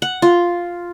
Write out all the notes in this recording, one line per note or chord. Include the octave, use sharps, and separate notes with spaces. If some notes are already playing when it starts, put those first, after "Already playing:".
F#5
F4